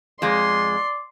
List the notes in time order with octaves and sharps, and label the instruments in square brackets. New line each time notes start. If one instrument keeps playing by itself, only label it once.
[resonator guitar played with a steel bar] F2 G#3 [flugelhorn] D5 [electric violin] C6